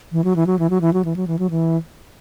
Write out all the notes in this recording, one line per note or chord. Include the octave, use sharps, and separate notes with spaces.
E3
F#3
E3
F#3
E3
F#3
E3
F#3
E3
F#3
E3
F#3
E3